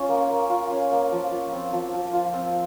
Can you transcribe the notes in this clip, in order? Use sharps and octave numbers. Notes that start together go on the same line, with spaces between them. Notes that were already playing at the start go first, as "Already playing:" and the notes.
Already playing: C#4 F4
A#3
A#3
F4
C#4
A#3
F3
F4
C4
F3
F3
F4
C4